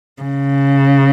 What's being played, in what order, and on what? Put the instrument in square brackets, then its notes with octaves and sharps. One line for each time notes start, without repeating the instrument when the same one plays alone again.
[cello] C#3